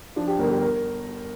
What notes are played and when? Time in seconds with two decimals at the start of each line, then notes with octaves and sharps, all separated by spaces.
0.16 F3 D4
0.28 G4
0.39 G1 A#4
0.50 G4
0.61 A#4